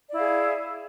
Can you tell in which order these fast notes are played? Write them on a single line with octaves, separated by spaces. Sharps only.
D5 E4 F5 G#4